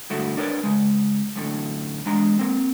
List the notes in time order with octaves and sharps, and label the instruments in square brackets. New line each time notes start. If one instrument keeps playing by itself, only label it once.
[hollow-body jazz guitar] G2 D3 A3 E4 F#4
D4 A#4 B4 C#5 D5
C#3 G#3
F#2 A2 D3
E2 G#3 D4 A#5
A#3 C4